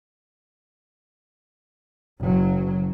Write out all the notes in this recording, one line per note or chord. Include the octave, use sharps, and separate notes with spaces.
F#1 F#3